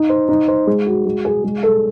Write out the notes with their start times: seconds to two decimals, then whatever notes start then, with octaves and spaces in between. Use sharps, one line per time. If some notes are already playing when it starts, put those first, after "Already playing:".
Already playing: D#4
0.09 C5
0.28 D#4
0.48 C5
0.67 G#3
0.86 F#4
1.06 G#3
1.25 G#4
1.44 G#3
1.63 A4